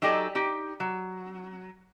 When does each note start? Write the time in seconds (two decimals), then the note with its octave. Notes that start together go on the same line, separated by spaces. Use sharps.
0.02 F#3 D#4 G4 A4 D5 G#5
0.35 D#4 G4
0.80 F#3